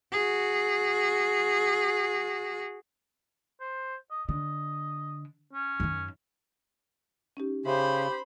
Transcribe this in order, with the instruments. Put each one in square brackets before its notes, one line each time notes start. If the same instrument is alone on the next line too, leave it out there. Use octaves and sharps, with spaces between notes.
[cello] F#4 G#4
[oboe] C5
D#5
[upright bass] D3 [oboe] D#5
[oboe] C#4
[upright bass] F#2 D#3
[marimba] C#4 D#4 G4
[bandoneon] C#3 [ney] G4 [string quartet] C5 B5 [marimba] E5